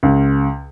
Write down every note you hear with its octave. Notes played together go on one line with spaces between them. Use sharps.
C#2